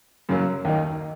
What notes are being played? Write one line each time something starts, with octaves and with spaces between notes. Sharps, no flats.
F#2 C#3 F#3 A#3
D#2 D#3 A#3 D#4